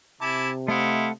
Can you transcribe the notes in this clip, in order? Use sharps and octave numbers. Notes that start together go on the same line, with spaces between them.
C3 E4 G#5 A5 D6
A3 E4 C5 D#5 F5 F#5